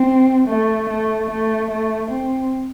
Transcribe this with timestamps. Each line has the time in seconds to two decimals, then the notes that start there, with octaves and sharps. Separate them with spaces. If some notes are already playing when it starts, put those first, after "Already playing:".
Already playing: C4
0.48 A3
0.89 A3
1.30 A3
1.70 A3
2.11 C4